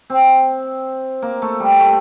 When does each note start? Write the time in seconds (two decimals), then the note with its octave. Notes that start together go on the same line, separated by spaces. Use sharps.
0.10 C4
1.22 A#3
1.42 A3
1.60 G3
1.79 A3